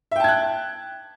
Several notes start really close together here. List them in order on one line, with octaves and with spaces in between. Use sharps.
E5 G5 A5 G#6 F#6